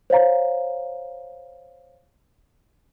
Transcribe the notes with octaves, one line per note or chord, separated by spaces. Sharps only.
C5 C#5 F5 A#5